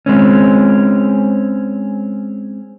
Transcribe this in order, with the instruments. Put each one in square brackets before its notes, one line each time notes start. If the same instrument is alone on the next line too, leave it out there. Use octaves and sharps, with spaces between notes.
[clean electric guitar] G#3 C4 C#4